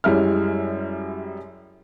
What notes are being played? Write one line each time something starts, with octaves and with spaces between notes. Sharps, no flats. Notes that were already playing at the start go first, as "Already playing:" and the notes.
F#2 G3 G#3 E4 F6